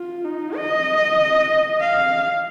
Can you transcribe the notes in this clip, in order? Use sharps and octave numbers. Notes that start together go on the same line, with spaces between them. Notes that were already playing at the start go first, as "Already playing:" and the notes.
Already playing: F4
D#4
D#5
F5